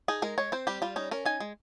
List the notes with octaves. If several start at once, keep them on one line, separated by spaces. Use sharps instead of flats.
D#4 G#4
G#3 A#4
G#3 C#5
C4 C5
G3 G4
G3 F4
C#4 D#4
C#4 A#4
D#4 G#5
G#3